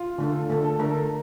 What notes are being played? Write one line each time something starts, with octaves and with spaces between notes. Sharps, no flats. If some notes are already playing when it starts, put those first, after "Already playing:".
Already playing: F4
D3 A3 D4 A4
D3 A3 D4 A4
A4
D3 A3 D4 A4 A#4